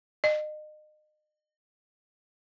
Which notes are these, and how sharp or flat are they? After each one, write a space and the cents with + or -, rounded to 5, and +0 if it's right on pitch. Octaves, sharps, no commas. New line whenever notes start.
D#5 -35